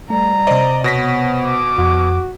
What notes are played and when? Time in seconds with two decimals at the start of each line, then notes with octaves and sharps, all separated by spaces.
0.10 G3 A3 A#5
0.47 C3 C5 D5 D#5
0.84 B2 B3 C#5 A#6 B6
1.45 D6
1.78 F2 F#4